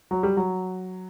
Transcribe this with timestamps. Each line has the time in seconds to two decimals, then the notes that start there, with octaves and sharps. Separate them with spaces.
0.11 F#3
0.23 G3
0.37 F#3